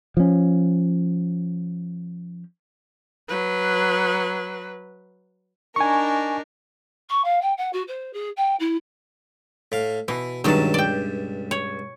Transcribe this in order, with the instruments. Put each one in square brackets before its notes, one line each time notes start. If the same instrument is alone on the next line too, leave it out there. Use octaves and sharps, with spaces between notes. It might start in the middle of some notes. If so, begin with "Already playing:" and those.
[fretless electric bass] F3 C#4
[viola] F#3 B4
[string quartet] D4 D#4 A#4 [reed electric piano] G#5 C#6
[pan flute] C#6
F5
G5
F#5
F#4
C5
G#4
G5
E4
[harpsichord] A2 F5
[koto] B2 [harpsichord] E3
[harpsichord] C#2 G2 A5 [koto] D#3 F#3 D4
[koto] D5 G5
C#5